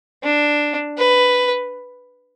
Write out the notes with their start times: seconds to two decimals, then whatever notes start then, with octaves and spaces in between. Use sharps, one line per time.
0.24 D4
0.98 B4